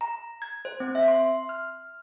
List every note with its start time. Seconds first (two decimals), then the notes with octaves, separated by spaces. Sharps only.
0.01 A#5
0.42 G#6
0.65 C5
0.80 C4
0.95 E5
1.08 C6
1.49 F6